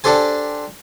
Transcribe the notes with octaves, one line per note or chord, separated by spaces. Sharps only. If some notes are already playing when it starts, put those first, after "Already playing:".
D4 G4 A4 C5 G#5